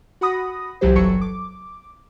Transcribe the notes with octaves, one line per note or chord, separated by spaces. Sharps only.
F#4 F#5 B5 D#6 A#6
C2 E3 F#3 G4 C5
G1 F#3 A4 C#6 C#7
D6